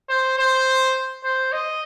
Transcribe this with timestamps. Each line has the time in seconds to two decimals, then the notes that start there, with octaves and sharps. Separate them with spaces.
0.09 C5
0.38 C5
1.24 C5
1.52 D#5